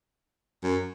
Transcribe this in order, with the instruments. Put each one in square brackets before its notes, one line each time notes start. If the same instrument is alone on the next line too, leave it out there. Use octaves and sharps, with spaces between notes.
[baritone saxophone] F#2